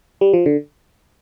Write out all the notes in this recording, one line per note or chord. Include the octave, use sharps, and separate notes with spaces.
G3
F3
D3